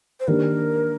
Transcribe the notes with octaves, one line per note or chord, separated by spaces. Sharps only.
C5
D#3 A#3 D4 G4 A#4